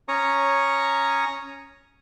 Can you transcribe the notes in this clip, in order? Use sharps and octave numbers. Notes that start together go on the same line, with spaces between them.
C#4 C#5 A#5 C#6 D#6